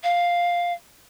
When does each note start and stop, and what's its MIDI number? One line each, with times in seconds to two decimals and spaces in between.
0.04 0.73 77